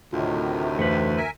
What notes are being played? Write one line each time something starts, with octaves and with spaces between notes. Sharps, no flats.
D2 A2 C3 D#3 F4
F2 E3 A3 B4 C5
A#4 E5 G#5